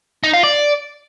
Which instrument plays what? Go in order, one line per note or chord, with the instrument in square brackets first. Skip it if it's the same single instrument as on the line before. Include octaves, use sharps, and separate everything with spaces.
[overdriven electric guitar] D#4
F4
D5